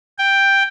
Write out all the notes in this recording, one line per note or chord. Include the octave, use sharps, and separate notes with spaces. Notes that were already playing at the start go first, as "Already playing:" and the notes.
G5